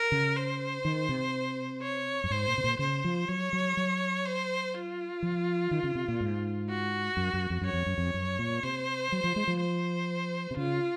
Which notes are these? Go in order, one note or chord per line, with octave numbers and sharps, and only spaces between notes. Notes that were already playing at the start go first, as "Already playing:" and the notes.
Already playing: A#4
C#3
C5
D#3
C3
C#5
F#2
G#2 C5
A#2
C3
A#2
C#3 C5
F3
F#3 C#5
F#3
F#3
C5
F4
F3
D#3
C#3
C3
A#2
G#2
F#4
F#2
F#2
F2
F#2 C#5
F2
F#2
F2
F#2
A#2
C3 C5
F#3
F3
G#3
F3
C5
C3
C#3 F4